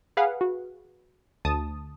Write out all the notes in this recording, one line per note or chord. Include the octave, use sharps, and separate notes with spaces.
G#4 B4 F5 F#5
F#4
D2 A5 D#6